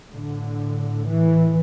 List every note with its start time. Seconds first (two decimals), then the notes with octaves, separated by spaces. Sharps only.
0.11 A2 D3
1.07 E3